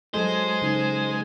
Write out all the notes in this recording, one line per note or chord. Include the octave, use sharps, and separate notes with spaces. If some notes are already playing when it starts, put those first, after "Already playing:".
F#3 G#3 A4 C5 D#5
C#3 D#4